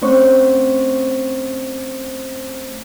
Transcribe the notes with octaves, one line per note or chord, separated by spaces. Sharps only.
A3 C4 C#4 C5 C#5 C#6